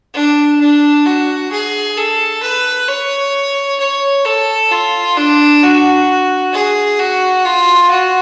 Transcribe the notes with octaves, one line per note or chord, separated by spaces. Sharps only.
D4
D4
F#4
G#4
A4
B4
C#5
C#5
A4
F4
D4
F#4
G#4
F#4
F4
F#4